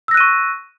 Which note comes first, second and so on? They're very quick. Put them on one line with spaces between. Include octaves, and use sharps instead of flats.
E6 A#6 F#6 D#7 C#6